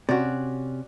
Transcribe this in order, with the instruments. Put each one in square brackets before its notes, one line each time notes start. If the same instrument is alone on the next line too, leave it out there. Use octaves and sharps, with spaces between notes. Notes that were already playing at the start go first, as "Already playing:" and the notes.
[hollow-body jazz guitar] C3 C#4 [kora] F#4 D5